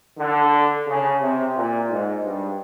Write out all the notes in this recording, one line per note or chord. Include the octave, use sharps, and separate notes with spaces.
D3
C#3
C3
A#2
G#2
G2